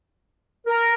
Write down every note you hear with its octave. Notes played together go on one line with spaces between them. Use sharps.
A#4